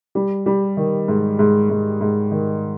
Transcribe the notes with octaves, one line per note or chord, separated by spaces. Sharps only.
G3
G3
D#3
G#2
G#2
G#2
G#2
D#3